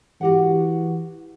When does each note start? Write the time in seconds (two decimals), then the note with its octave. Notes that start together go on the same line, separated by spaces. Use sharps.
0.21 E3 F#4 G4 F#5